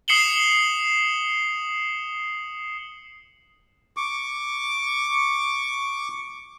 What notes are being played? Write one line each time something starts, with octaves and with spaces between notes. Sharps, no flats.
D#6 C7 C#7 E7 F#7 G7
C#6 D6